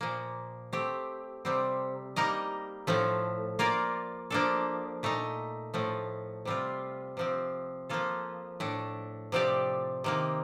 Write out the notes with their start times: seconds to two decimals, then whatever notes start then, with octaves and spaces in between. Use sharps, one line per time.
0.01 A#2 F3 A#3
0.73 A3 C4 G4
1.45 C3 G3 C4
2.16 G3 A#3 D#4 A#4 D#5
2.87 A2 F3 A3
3.59 A#3 F4 A#4 D5
4.30 F3 A#3 D4 A4
5.03 A#2 A3 D#4
5.74 A2 F3 A3
6.45 C3 G3 C4 F4
7.17 C3 F3 C4
7.89 F3 A#3 F4 A4
8.60 A2 A3 D4
9.32 C3 F3 C4 G4 D5
10.04 C3 D#3 A#3